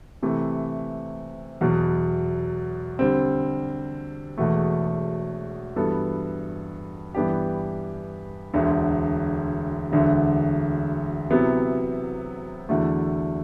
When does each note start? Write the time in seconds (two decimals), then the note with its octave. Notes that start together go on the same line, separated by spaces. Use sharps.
0.23 C3 E3 A3
1.61 E2 B2 F#3
2.99 D3 G3 C4
4.38 E1 E2 B2 A3
5.76 G2 E3 B3 F#4 A4
7.15 G2 E3 B3 D4 G4
8.54 E1 D2 D3
9.92 E1 D2 D3
11.30 C3 F#3 B3 E4
12.69 E2 D3 F#3 A3 E4